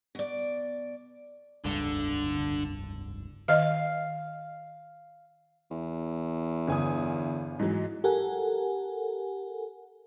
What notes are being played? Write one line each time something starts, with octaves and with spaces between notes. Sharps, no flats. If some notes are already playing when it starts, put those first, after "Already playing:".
B2 D5
F1 C#2 G2 D3
D#3 D#5 F5
E2
G1 G#5 D#6
G#2 E3 F#3
G4 A4 A#4 F#5 G#5